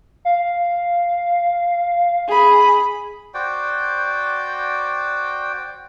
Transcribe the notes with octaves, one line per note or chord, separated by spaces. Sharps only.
F5
G#4 B5
F#4 C5 D5 G5